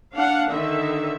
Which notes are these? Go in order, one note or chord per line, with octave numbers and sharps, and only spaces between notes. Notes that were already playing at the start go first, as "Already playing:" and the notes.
D4 F5 F#5
D3 D#3 E5